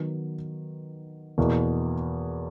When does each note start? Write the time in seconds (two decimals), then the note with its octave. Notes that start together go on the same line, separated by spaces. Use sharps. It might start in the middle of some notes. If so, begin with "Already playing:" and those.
Already playing: D#3 F#3 B3
1.38 E2 B2 A#3 E4